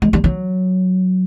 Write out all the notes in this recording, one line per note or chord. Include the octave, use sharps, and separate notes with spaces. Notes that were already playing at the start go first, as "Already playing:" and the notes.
G#3
G3
F#3